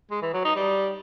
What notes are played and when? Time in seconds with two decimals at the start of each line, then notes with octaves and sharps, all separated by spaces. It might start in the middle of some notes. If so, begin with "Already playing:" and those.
0.11 G#3
0.22 E3
0.33 F#3
0.45 D#4
0.56 G3